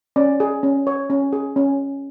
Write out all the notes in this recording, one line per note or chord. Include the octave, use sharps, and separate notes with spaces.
C#4 D5
G#4
C#4
C#5
C#4
G#4
C#4